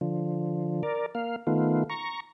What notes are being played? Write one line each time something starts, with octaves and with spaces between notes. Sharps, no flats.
D3 F3
A#4 D5
A#3 F5
D#3 A3 B3 F4
A#5 C#6